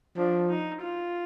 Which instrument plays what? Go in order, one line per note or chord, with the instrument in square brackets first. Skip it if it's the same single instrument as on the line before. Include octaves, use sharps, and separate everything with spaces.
[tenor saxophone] F3 [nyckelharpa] D4
[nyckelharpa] D#4
F4